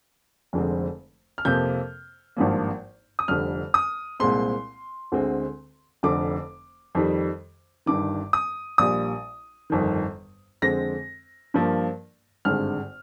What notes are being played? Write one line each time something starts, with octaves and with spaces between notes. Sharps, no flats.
F1 F2 D3 G#3 C4
F6
F2 C3 F3 A#3 G6
G#1 G2 F3 A#3
D#6
F1 F2 D3 G3 F6
D#6
C2 A#2 G#3 C4 C6
D2 D3 G#3 C4
F1 F2 D3 D6
F2 D#3 G3
G1 G2 D#3 D6
D#6
A#1 A#2 G3 D#6
G1 F2 D#3
F2 D3 G#3 C4 A#6
G2 F3 A#3
G#1 G2 D3 G#3 C4 F6